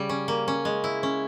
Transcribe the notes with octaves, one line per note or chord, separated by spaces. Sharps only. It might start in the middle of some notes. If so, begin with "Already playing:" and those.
Already playing: C#3 G3
C#4
A#3
C#4
G#3
E4
C#4